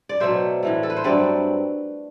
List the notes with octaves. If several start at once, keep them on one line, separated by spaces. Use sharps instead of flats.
D5
B2 F#3 A3 C5 E5
A2 E3 A3
A4
B4
C5
G2 F#3 A3 C4 B4 D5